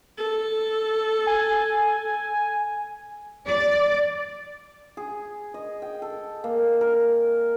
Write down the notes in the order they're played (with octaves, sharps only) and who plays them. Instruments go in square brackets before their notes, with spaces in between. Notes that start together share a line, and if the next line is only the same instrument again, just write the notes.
[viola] A4
[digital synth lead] G#5
[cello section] D5
[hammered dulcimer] G#4
D#5
G5
A4
A#3
A#4